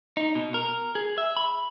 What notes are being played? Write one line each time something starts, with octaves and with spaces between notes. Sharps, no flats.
D#4
B2
A#4
G#4
E5
B5